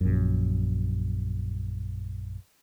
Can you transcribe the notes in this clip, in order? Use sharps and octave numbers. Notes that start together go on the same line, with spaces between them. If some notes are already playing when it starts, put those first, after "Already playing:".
A#1 F#2